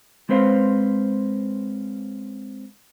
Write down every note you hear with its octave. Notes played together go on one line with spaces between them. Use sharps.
G#3 C4 C#4 B4 C5 F5